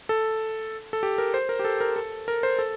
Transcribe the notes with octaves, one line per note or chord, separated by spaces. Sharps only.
A4
A4
G4
A#4
C5
A#4
G4
A4
A#4
A4
A#4
C5
A4